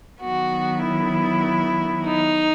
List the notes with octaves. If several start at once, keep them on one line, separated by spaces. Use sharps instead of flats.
D#3 F#3 B3 F#4
E4
D#4